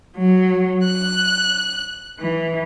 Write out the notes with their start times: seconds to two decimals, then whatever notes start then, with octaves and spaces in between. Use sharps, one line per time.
0.17 F#3
0.84 F#6
2.20 E3